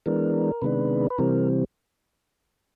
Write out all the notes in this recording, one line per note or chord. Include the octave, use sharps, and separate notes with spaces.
E3 G#3 B3 D4 A#4
C3 D#3 G#3 B3 D4 B4
B4
C3 E3 G3 C4 A#4